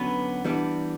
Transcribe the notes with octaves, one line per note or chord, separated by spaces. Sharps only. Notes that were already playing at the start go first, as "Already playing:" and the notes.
Already playing: D3 F#3 B3 C#4 B4
E3 G3 B3 D4